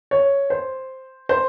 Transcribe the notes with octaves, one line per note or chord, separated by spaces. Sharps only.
C#5
C5
C5